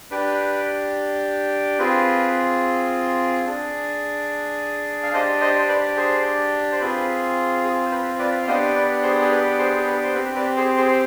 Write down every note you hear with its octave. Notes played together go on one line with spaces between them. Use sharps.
D4 G4 B4
C4 F4 G#4 B4
D4 G#4
F5
D4 G4 C5 D#5
C5 D#5
C5
B4 D5
G#4 C5
C5
C4 F4 G#4 B4
G#4
C5
B4
B4 D5
F5
B3 D4 G4 C5 D#5
B4 D5
G#4 C5
G#4
B4
G#4 C5
G#4
B4
C5
C4 G4 B4
B4 D5
G#4 C5
G#4 C5
C5